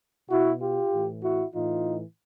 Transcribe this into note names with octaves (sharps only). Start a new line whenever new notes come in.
B2 E4 F#4
F4 G4
A2 E3
E4 F#4
A2 E3 D#4 F4